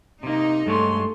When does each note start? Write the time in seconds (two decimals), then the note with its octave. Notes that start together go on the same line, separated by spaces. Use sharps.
0.23 C3 A#3 D#4
0.66 G2 G#3 A3 C#5 C6